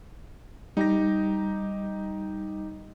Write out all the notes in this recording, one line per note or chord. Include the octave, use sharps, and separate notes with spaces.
G3 D#4 G4 A#6